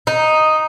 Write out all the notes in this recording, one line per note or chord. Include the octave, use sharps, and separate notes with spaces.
D#4